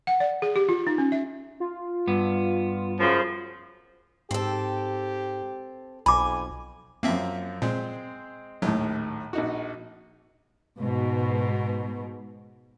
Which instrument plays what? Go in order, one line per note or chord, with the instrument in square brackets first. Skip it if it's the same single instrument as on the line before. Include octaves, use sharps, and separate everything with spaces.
[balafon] F#5
D5
G#4
G4
F4
D#4
C#4
E5
[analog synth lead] F4
[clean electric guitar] G2 B3
[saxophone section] F#2 C#3 F3
[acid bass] G#2 [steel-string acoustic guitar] C4 A4 [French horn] G4
[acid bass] B1 [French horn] F2 [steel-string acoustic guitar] G#5 [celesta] B5 D6
[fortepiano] F#2 F3 F5 [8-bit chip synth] A#3 C4 E5
[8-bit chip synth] A#2 [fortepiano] G#3 C4
[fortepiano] A#1 D#2 A2 [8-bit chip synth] F#3
[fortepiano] A#1 D#4 F#4
[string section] G#2 B2